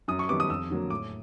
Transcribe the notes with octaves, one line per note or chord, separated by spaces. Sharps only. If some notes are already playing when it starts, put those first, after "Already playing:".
F#2 D#6
C#6
D#3 G3 B3 D6
D#6
F2 E6
D3 F#3 A#3
A2 D6